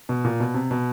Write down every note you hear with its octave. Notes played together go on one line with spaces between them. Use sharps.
B2
A#2
B2
C3
B2